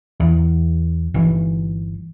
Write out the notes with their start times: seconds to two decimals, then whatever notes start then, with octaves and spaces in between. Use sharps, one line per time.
0.20 E2
1.14 G1 E3